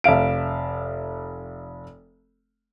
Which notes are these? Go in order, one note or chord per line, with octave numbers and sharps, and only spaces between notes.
F1 E5 F5 D7